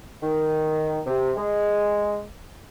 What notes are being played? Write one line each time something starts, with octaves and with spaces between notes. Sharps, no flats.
D#3
C3
G#3